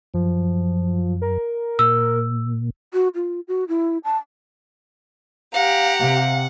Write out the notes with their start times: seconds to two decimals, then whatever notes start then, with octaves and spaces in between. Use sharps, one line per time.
0.14 F#2 F3
1.22 A#4
1.79 A#2 E6
2.93 F#4
3.15 F4
3.48 F#4
3.68 E4
4.04 A5
5.54 G4 F5 F#5 A#5
5.99 C3 F5